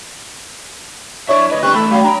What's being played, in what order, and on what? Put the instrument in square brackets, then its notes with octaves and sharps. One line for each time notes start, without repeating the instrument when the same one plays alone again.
[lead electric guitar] F#2 E5 [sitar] D4 E4 D5 [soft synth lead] C#5 [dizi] C#6
[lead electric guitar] D2 B4 [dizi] C#5 [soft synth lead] D#5
[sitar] G3 C4 D4 [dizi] C#6 [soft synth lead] F#6
[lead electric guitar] E3 A3 [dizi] A4 [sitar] E5 [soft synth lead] B5
[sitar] F#3 [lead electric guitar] A3 C#4 [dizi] F5
[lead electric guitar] D4 G5 [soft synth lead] A#5 [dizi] B5